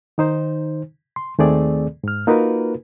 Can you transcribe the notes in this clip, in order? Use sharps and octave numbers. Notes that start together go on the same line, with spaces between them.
D#3 D#4 C5
C6
D#2 D#3 A3 C4 G#4 D5
G#2 F6
A#3 D#4 F4 F#4 A#4 B4